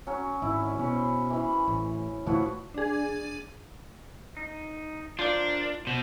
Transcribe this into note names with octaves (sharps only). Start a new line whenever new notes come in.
F#3 C#4
G#1 E4
B2 C#4 B4 C5
E3 B5
A1
D2 A2 E3 F3 F#4
D4 G#4
D#4
D4 F4 A#4 C5 D5
B2 C5